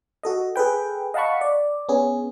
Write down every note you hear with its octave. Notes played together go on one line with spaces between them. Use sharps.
F#4 A4 D#5
G#4 A4 B4 G5
D#5 F5 F#5 A5 B5 C#6
D5
B3 C#4 G#4